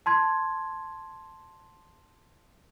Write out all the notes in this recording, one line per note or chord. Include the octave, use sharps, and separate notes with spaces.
A5 C6 G#6